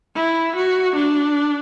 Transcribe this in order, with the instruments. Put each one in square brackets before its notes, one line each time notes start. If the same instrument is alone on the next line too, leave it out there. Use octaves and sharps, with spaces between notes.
[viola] E4
F#4
D4